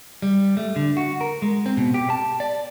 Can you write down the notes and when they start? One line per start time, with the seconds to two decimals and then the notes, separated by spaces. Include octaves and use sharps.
0.22 G3
0.57 A3
0.76 D3
0.97 F#4
1.21 A#4
1.42 G#3
1.66 C4
1.77 B2
1.94 G4
2.10 A5
2.40 D5